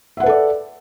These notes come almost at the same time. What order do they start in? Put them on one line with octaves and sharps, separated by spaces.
E5 F#5 B4 A4 D5